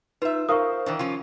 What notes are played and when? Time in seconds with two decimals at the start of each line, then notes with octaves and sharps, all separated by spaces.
0.22 D#4 F4 B4 E5
0.49 A#4 C5 F5 C#6 D#6
0.86 D#3 E3 D4
0.99 F3 C#4 F4